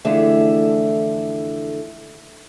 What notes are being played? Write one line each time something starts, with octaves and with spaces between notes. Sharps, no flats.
F2 D3 E3 A3 G#4 E5